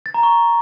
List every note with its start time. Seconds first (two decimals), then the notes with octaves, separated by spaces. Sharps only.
0.06 A6
0.14 A#5
0.23 C#6